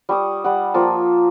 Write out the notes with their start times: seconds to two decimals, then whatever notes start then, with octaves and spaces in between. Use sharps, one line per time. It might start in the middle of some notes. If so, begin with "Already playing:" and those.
0.09 G3 C#6 D#6
0.44 G3 F#5
0.74 F3 A#3 A5